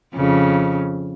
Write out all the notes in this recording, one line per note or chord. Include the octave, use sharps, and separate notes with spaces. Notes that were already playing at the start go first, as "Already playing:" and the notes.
F2 C#3